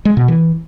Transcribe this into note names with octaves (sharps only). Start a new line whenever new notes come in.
G#3
B2
E3